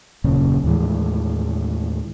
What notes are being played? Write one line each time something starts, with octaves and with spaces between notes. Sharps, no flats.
D#1 F#2 A#2 C#3
D#2 A2 E3 G#3